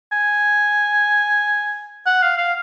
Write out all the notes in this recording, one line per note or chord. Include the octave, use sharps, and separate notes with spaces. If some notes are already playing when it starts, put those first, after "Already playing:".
G#5
F#5
F5
F5